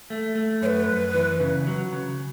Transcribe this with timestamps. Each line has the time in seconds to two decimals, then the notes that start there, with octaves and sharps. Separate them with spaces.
0.10 A3
0.35 A3
0.62 F#2 C#5
0.66 B4
0.89 F#2
1.14 E3
1.40 C#3
1.67 F#3
1.93 C#3